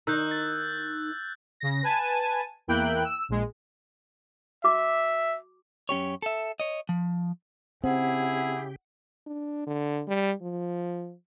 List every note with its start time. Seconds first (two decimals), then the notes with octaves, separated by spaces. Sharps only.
0.07 D#3 D#4 E6 F#6 G6
0.31 A6
1.60 C#3 A#6
1.83 B4 G#5 A5 D#7
2.67 E2 A#3 E4 G5 F#6
3.05 E6
3.29 A#1 G#3
4.64 F#4 E5 D6
5.89 F#2 C#4 G4 C#5
6.22 A4 E5
6.60 C#5 D#5
6.89 F3
7.84 C#3 C4 E4 G4 G#4 F#5
9.27 D4
9.67 D3
10.08 G3
10.42 F3